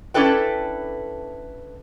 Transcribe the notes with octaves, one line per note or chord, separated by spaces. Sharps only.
C#4 D4 E4 A4 B4 G5